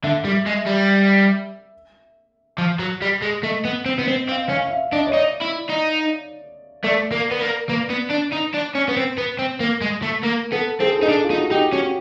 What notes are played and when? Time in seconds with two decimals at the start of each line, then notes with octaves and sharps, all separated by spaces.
0.03 D3 E5
0.25 G3
0.47 G#3
0.67 G3
2.58 F3
2.79 F#3
3.02 G3
3.22 G#3
3.43 A3 D#5
3.65 B3
3.86 C4
3.99 B3
4.08 C4
4.29 C4 F5
4.50 C#4 F5
4.66 F5
4.71 E5
4.92 D4 D#5
5.07 C#5
5.13 D#4 D5
5.42 E4
5.70 D#4
6.84 A3 D5
7.12 A#3
7.31 B3
7.41 A#3
7.68 A#3 B4
7.90 B3
8.11 D4
8.33 D#4
8.54 D4
8.75 C#4
8.89 B3
8.97 C4
9.18 B3
9.39 C4
9.60 A#3
9.82 G#3
10.03 A3
10.24 A#3 A#4
10.52 B3 A4
10.80 C4 G#4
10.90 A4
10.99 G#4
11.03 D#4
11.09 D4 A4
11.24 F4
11.30 D#4
11.38 F#4
11.51 D#4 G4
11.72 C#4 F#4